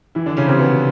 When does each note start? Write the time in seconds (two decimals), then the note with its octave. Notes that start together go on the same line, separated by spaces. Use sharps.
0.15 E3 E4
0.26 D3 D4
0.37 C#3 C#4
0.48 C3 C4
0.59 B2 B3